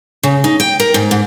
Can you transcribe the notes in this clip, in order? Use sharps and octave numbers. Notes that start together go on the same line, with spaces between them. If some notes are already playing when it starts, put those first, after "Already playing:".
C#3
D#4
G5
A#4
G#2
G#2